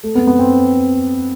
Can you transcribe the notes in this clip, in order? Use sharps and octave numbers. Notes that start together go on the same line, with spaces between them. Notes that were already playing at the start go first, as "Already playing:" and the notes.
A3
B3
B3
C4